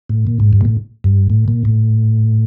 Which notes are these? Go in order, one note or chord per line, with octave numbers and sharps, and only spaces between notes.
A2
A#2
G#2
G2
A#2
A2
G2
A2
A#2
A2